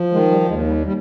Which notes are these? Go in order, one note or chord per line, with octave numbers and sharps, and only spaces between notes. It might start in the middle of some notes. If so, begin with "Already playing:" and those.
Already playing: F3
D#3 G#3
G3
D#2 G#3
G3
G3